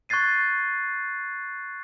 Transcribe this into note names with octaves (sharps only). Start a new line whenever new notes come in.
C#6 F#6 G#6 A6 C7 D#7